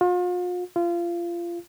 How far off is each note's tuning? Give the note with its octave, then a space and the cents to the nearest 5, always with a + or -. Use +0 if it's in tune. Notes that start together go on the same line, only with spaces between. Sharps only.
F4 +40
F4 -25